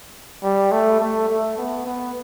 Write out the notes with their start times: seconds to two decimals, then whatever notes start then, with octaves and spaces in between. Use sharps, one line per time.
0.44 G3
0.72 A3
1.01 A3
1.29 A3
1.58 B3
1.86 B3